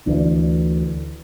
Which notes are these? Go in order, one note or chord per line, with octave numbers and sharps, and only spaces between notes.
D2 E3 D4